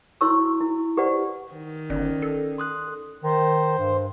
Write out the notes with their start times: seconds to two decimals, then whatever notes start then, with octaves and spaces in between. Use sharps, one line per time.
0.21 E4 F#4 C#5 C6 C#6 E6
0.61 E4
0.97 G4 B4 C5 D5 F#5
1.53 D#3
1.90 G1 C#4 D5
2.22 A4
2.58 C6 D#6 F#6
3.24 D#3 C5
3.79 G2